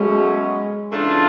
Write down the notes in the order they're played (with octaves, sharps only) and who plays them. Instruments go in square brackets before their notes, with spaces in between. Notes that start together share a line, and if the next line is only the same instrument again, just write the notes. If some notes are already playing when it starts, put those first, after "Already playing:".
Already playing: [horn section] B2 F#3 A3 C#4 [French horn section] G#3
[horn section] C#3 E3 A3 D4 F4